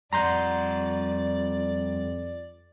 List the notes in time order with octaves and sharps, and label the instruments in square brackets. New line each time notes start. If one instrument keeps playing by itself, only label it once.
[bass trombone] F2 [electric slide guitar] G3 F#5 [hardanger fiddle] D5 [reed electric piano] A#5 C6 G6